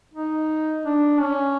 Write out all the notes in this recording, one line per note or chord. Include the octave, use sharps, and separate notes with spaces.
D#4
D4
C#4